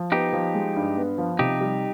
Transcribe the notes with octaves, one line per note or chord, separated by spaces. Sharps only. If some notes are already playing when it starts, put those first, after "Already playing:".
Already playing: F3
B3 D#4 G4
F3
G#3
G2
B3
F3
C3 D#4 G4
G3